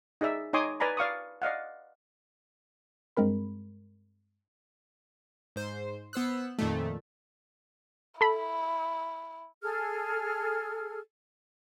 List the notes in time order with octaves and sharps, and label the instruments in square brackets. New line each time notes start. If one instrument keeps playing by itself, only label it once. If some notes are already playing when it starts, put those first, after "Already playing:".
[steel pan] D#4 G#4 D5 E5
D#4 C#5 G#5 C6 D6 D#6
B4 D5 G#5 A#5 B5
D5 F5 C#6 D#6
D5 D#5 F5 F#5
[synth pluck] G2 G#3 C4 A#4 B5
[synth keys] G#2 C5
B3 C5 E6 F#6
F2 A#2 D#3 A3
[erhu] E4 [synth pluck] A4 B5
[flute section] G#4 A4 F6